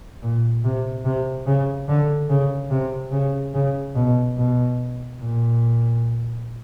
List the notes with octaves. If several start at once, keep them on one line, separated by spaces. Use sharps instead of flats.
A#2
C3
C3
C#3
D3
C#3
C3
C#3
C#3
B2
B2
A#2